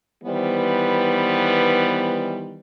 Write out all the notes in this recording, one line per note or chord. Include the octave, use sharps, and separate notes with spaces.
D#3 E3 G3 B3 B4 C5